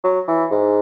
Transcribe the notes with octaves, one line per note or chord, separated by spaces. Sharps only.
F#3
E3
G#2